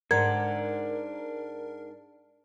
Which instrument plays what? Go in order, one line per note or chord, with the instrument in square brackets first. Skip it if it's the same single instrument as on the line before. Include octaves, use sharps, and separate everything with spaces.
[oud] G#2 [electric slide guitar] D4 F#5 [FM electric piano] A#4 [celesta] G#6